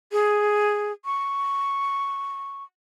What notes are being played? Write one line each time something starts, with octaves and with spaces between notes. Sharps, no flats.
G#4
C#6